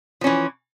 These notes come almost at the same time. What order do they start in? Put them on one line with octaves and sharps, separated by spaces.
F3 C#4 E3